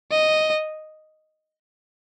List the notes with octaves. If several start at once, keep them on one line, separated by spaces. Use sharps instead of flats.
D#5